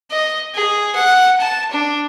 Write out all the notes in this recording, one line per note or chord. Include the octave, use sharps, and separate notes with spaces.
D#5
G#4
F#5
A5
D4